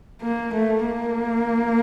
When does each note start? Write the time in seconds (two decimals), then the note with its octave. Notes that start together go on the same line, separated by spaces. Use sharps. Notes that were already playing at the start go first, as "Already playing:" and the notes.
0.23 A#3
0.55 A3
0.89 A#3